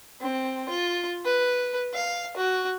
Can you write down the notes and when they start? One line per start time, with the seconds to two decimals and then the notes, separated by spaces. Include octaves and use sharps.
0.21 C4
0.69 F4
1.25 B4
1.94 F5
2.37 F#4